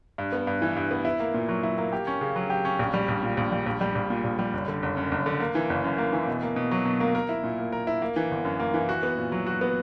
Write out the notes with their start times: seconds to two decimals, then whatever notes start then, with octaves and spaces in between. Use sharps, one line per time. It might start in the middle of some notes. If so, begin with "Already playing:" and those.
0.18 G2
0.32 B3
0.47 G2
0.62 E3
0.76 G2
0.91 B3
1.05 E4
1.20 A#3
1.34 A#2
1.49 F#3
1.63 E4
1.78 A#3
1.93 G4
2.07 C#4
2.21 C#3
2.36 F#3
2.50 G4
2.65 C#4
2.79 A#1
2.94 G3
3.08 A#1
3.23 A#2
3.37 A#1
3.52 G3
3.66 A#1
3.81 G3
3.95 A#1
4.10 A#2
4.24 A#1
4.39 G3
4.53 F#1
4.68 D3
4.83 F#1
4.97 F#2
5.12 F#1
5.26 D3
5.40 A#3
5.55 E3
5.70 F#1
5.84 F#2
5.98 A#3
6.13 E3
6.28 B2
6.42 A#3
6.56 B2
6.71 F#3
6.85 B2
7.00 A#3
7.15 A#4
7.29 E4
7.43 A#2
7.58 A#3
7.72 A#4
7.87 E4
8.02 A#3
8.16 E3
8.31 G1
8.45 F#2
8.60 A#3
8.74 E3
8.89 F#4
9.03 B3
9.18 A#2
9.32 F#3
9.47 F#4
9.61 B3